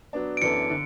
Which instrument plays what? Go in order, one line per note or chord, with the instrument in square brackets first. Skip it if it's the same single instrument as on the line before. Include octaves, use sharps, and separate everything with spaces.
[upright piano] F#3 B3 D4
[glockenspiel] D7
[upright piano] F#2 E3 B3 D4 A4 [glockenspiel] C#7
[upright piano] D3